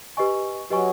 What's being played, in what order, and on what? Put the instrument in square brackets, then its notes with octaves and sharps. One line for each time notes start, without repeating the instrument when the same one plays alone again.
[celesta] G4 B4 D#5 G#5 C#6
[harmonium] F#3 [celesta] G4 B4 D#5 G#5 C#6